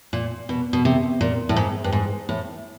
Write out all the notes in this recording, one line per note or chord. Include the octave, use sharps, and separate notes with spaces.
A#2
B2
B2
C3
A#2
A2
G#2
G2
G#2
A2